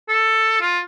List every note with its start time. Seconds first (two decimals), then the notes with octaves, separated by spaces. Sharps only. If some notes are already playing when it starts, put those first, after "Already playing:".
0.08 A4
0.61 F4